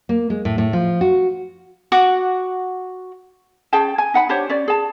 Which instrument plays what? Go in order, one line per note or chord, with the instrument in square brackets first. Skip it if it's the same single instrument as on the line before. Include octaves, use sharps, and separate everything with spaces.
[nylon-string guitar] A#3
G#3
A2
A2
F3
F#4
[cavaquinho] F#4 F#5 D6
[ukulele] C#4 G#4 G5 A5
G#5
D#4 F#5 B5
D4 G4 C5 C#5
C#4 D5
G#4 A5